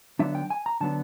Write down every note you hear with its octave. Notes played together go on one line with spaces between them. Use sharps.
D3 F#3 B3 D4 E5
G5
G#5
A#5
D3 F#3 B3 D4 A5